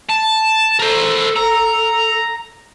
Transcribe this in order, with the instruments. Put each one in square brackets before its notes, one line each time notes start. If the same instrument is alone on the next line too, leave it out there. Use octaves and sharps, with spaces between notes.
[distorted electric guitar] A5
[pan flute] A4 [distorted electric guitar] A#4 C5
[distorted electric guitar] A#5